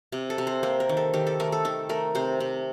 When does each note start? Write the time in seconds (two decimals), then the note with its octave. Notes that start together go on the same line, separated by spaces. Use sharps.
0.12 C3
0.30 A4
0.38 C3
0.47 C5
0.63 A#3 C5
0.80 A#4
0.89 D#3
0.97 A4
1.14 D#3 G4
1.27 A4
1.40 A3 A#4
1.52 A4
1.65 D#3 A4
1.89 A3 A#4
2.15 C3 C5
2.40 C3